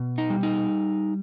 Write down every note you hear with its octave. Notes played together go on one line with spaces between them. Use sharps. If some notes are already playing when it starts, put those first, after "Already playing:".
Already playing: B2
D#4
G3
D#4